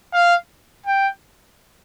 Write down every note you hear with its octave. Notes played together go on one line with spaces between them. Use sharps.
F5
G5